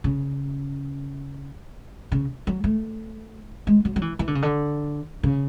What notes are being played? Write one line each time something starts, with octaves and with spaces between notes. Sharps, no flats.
C#3
C#3
F#3
A3
G#3
F#3
F#3
E3
E3
D3
C#3
D3
C#3